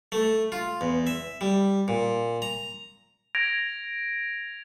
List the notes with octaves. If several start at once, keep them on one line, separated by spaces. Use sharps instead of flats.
A3
F4
E2
E5
G3
A#2
A#5
G#6 A#6 D7 F7